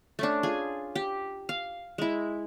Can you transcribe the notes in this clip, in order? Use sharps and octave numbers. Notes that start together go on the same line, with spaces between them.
A3 C#4 D4
F4 G#4 G#5
G4
F5
G#3 E4